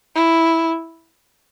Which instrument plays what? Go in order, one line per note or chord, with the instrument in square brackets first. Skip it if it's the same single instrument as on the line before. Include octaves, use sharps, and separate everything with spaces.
[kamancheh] E4